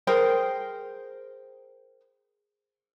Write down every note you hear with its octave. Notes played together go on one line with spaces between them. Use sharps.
G#4 A#4 C5 G5